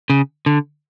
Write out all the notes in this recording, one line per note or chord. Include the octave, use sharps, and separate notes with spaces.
C#3
D3